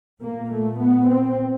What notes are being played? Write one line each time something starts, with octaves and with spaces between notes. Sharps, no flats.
A#2 A#3
A3
B3
C4